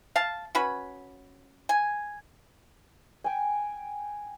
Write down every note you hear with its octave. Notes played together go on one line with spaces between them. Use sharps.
F5 A5
C#4 F#4 B4 B5
G#5
G5 G#5